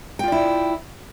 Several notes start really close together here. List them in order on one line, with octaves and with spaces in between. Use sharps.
G5 F4 D5 E4